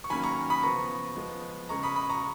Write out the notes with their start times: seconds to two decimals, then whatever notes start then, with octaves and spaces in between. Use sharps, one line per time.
0.04 C#6
0.10 D#3 F#3 A#3 C#4 G#5 B5
0.23 A#5 C#6
0.50 B5 D#6
0.63 C#3 F3 B3 A#5 C#6
1.16 F3 G#3 B3
1.69 C#3 G#3 C#4 A#5 C#6
1.83 B5 D#6
1.96 B5 D#6
2.09 A#5 C#6